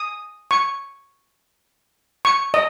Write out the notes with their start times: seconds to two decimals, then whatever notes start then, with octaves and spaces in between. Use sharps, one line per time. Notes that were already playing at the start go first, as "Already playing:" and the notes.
Already playing: D#6
0.51 C#6
2.25 C#6
2.54 D#5